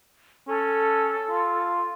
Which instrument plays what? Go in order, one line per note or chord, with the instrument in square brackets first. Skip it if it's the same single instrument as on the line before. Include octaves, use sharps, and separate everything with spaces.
[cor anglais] C#4 [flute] A4
[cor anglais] F4